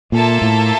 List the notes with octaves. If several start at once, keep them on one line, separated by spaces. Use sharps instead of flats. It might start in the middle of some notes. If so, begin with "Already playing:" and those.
A#2 A#3 F4 A4 E5 A5
A2